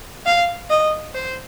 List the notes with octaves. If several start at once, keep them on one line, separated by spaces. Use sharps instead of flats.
F5
D#5
C5